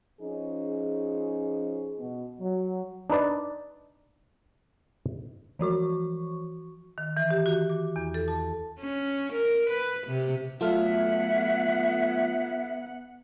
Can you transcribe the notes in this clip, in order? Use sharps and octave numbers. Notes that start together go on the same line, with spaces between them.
F3 C#4 D#4 G#4
B2
F#3
D4 D#4 B4 D5
E3 F3 F#4 C#6
D#3
E3
G4
F#4
D6
E2
A4
A5
C#4
A#4
B4
C3
F#3 A3 B3 F4 A4 E5 F#5 F6